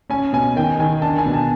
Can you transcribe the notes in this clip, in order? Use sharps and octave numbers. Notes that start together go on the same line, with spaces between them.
C#4 G#5
B2 G#5
D#3 G5
D#3 G#5
D4 A5
G#5
B2
A5